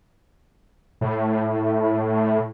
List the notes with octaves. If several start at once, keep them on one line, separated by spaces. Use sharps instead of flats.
A2